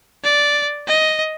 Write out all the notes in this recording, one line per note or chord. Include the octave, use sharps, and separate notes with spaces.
D5
D#5